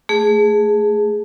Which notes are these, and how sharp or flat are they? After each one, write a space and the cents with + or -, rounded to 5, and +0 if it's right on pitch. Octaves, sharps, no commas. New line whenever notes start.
A3 +0 G#4 +0